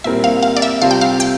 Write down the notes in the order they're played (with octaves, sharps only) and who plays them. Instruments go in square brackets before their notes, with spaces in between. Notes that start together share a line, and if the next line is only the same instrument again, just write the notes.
[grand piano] A#2 G3 C4 E4 A#4 [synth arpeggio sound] E5
[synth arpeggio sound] F5
F5
D5
E5
[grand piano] C3 G3 C4 F4 A4 [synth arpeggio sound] F5
[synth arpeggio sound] G5
F5
G5